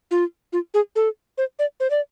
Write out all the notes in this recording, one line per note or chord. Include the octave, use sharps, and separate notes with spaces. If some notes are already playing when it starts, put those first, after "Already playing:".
F4
F4
G#4
A4
C5
D5
C5
D5